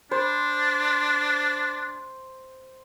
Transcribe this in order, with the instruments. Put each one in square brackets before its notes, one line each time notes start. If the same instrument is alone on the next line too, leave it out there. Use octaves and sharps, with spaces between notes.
[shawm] D4 [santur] C5